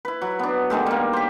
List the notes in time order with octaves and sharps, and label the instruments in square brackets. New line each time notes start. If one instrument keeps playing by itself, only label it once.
[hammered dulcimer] E4 B4
F#3
B3 D4
D3 D#3 G#3 A3
G3 A#3
G4 C5